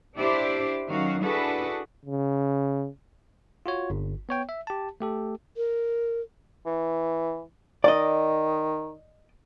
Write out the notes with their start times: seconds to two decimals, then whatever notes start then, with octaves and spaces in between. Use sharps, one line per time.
0.18 D4 E4 G4 C5 D5
0.90 D#3 F#3 C#4 F#4 F5
1.22 D4 E4 F#4 G#4 A4 B4
2.05 C#3
3.66 F4 F#4 C#5
3.90 G1
4.29 B3 C#5 G5
4.49 E5
4.67 G4 A5
5.00 A3 G4 A4
5.57 A#4
6.66 E3
7.84 D#3 D5 D#5